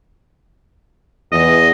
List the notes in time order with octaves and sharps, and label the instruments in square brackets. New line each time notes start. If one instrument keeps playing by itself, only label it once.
[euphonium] E2 [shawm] D#5